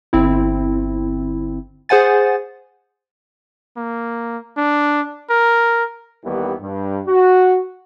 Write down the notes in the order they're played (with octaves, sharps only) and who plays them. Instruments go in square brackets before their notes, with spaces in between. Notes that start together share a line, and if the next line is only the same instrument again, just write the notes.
[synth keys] G1 C4 E4
G#4 C5 F#5 G#5 A6
[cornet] A#3
D4
A#4
[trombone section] D#2 D#3 E3 G3 B3
G2
F#4